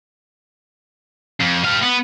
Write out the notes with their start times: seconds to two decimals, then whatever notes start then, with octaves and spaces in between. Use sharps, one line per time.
1.40 F2
1.64 G3 F5
1.82 B3